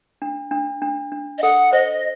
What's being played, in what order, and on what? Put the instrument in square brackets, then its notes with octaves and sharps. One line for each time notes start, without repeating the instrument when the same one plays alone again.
[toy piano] D4
D4
D4
D4
[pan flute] D#5
[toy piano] A4 [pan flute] F#5
[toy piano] C5 [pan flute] D#5